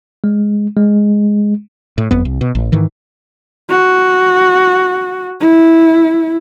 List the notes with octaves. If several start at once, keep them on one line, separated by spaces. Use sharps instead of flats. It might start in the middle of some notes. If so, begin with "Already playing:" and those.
G#3
G#3
A2
F#1 F2 B3
C2
B2
A1
G#2 D#3 E3
F#4
E4